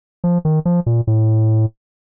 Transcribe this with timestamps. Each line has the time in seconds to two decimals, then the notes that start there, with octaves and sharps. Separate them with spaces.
0.24 F3
0.45 D#3
0.65 F3
0.86 A#2
1.07 A2